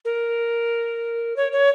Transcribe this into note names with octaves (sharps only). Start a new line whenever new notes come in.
A#4
C#5
C#5